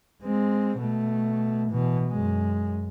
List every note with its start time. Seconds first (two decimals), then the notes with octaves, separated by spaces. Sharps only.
0.24 G#3 C4
0.79 B2 A3
1.72 B2 E3
2.09 F#2 G#3